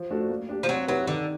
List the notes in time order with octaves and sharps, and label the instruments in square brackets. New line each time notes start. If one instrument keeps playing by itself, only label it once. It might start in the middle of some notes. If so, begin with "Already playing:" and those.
Already playing: [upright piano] F3
A3 D4 F#4 A4
A#3
D4 G4
[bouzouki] F3
[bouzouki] F#3 [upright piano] C4
[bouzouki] F#3 [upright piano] E4 G4 B4
[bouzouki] D3 [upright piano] D#3